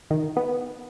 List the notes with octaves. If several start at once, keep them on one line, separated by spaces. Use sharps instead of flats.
D#3
B3